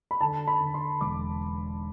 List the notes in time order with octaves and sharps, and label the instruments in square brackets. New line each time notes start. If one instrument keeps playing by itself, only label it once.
[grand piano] B5
D3 A5
B5
D3
C6
E1 D6